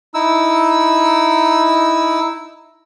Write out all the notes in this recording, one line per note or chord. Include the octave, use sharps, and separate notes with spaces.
D#4 E4 E6